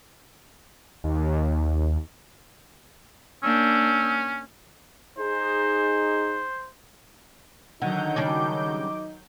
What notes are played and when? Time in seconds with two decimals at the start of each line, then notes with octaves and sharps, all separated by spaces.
1.04 D#2
3.43 A#3 C#4 D4 E6 G6
5.18 D#4 G#4 C5
7.82 D3 D#3 F#3 D#4 F#5 G6
8.16 C#3 G3 D4 D6